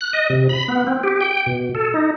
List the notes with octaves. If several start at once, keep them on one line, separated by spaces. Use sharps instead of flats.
F#6
D#5
C3
B5
B3
C4
G4
G5
B2
A4
D#4